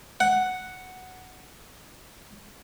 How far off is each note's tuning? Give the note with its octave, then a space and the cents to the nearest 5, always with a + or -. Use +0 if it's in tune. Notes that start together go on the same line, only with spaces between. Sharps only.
F#5 +0